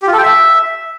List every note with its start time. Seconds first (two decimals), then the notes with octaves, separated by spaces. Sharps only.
0.02 G4
0.07 F4
0.13 A4
0.18 G5
0.23 E5